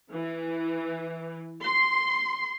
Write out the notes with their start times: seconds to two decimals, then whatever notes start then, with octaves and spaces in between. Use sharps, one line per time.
0.13 E3
1.63 C6